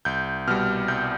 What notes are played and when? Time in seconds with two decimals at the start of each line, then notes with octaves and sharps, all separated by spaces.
0.05 C2 G6
0.48 B2 G3 F6
0.88 C2 G6